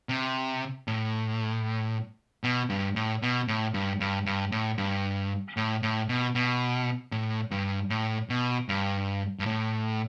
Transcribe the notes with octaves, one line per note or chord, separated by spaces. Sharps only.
C3
A2
B2
G2
A2
B2
A2
G2
G2
G2
A2
G2
A2
A2
B2
B2
A2
G2
A2
B2
G2
G2
A2